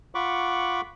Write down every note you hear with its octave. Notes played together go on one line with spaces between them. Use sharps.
F4 F#5 B5 C#6 D6